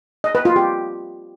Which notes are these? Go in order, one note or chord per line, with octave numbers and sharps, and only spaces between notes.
D#5
B4
F4
G4